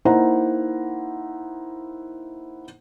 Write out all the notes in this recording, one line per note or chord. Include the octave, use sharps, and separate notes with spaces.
A#3 D#4 E4 C5 F#5 A#5